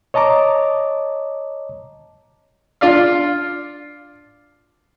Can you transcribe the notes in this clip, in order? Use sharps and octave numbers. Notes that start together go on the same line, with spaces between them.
C#5 D#5 A5 A#5 D6
D4 F4 D5 F5